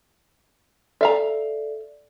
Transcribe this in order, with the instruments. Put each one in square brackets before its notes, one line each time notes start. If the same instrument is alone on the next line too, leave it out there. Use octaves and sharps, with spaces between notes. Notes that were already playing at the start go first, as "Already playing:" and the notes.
[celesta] A4 D5 [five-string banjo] E5 F5 A#5